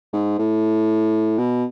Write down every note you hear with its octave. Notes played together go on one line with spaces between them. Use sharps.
G#2
A2
B2